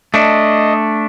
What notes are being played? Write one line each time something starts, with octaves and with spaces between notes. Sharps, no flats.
A3 D4 D#5